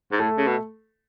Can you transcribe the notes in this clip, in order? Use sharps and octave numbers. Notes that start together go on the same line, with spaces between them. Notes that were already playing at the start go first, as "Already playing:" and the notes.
G#2
A2 A3 A4
C#3
B2